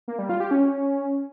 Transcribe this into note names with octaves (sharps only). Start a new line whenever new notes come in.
A#3
G3
F4
G4
C#4